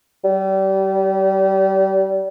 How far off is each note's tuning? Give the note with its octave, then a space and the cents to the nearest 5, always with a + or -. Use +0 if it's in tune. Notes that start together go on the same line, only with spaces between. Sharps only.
G3 -30